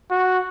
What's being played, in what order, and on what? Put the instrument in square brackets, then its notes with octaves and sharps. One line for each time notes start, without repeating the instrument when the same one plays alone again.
[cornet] F#4